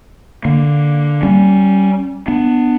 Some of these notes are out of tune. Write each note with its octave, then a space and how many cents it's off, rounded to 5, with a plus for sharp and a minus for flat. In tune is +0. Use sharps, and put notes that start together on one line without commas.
D3 +0 A#3 +0
G3 -15 C#4 +0
B3 +0 D4 +20